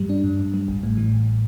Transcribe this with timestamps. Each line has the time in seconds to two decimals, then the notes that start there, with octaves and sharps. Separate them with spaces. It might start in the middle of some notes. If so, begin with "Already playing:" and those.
Already playing: G2 G3
0.09 D4
0.24 G2
0.39 G2
0.54 G3
0.68 A1
0.83 A2
0.97 E3
1.13 A1